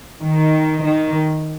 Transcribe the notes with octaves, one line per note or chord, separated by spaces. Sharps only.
D#3
D#3